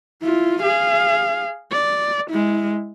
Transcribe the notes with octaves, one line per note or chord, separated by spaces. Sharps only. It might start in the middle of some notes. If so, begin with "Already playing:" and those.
E4 F4
G#4 F5
D5
G#3 E4